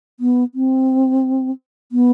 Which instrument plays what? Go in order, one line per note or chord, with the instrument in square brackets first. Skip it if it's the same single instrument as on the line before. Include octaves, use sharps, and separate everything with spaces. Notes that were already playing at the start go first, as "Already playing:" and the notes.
[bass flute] B3
C4
B3